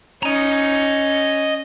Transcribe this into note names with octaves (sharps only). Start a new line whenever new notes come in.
C#4 D#5 A#5